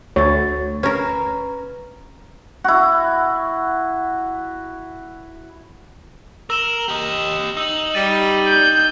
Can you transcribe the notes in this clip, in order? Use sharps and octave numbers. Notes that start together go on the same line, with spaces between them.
D2 F#4 C#5 A6
C#4 A#4 B4 A#5
E4 F#4
A#4 E6 E7 G7
G4 D#5
D#4 E6 F#7
G3 A6 D#7
G6